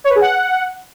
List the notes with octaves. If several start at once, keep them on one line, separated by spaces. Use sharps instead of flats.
C#5
B4
G#4
F#5